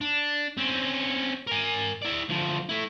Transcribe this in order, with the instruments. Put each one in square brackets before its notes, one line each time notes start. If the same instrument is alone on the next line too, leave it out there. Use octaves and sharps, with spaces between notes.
[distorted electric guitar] D4
C4 C#4
A#4 G#5
E4 D5
D2 F3
A3 E4